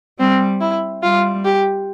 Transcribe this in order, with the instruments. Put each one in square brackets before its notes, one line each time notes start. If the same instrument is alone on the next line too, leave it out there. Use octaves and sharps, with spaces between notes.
[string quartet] G3 [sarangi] C4
[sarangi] E4
[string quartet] G3 [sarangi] F4
[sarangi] G4